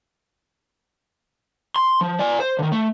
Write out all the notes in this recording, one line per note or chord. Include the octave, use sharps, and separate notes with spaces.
C6
F3
D5 G#5
C5
D3 D#3
A3